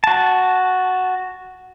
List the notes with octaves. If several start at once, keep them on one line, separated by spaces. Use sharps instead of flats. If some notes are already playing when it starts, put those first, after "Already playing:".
F#4 A5